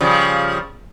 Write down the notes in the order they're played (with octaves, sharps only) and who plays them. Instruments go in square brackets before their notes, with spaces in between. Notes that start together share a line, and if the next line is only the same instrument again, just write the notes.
[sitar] C#3 F3 G3